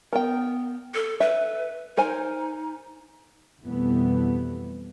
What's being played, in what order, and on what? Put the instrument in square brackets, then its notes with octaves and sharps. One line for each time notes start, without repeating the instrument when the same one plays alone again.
[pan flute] B3 [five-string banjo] A#4 G5
[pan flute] A4
[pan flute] B4 [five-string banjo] E5
[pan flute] D#4 [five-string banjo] A#4 C5 G#5
[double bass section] F2 B2 E3 G3 A3 B3